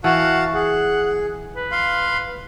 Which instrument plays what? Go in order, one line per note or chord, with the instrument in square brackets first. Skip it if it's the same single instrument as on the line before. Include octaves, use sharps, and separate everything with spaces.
[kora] E3 [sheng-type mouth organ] F#4 F5 A5 [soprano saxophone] F#5
[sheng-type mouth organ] G#4 [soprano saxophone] F#5
[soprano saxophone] B4
[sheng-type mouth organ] F5 C6